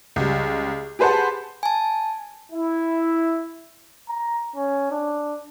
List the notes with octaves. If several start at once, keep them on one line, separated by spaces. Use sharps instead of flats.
C#2 G3
G4 G#4 B4 C5 F#5 A5
G#5 A5
E4
A#5
C#4
D4